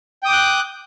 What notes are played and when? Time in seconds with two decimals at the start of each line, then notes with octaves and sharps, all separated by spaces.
0.23 G5
0.25 D#6
0.28 D6
0.30 G6
0.33 F#6